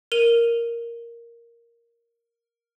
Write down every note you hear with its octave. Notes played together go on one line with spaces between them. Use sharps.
A#4 D#7 F7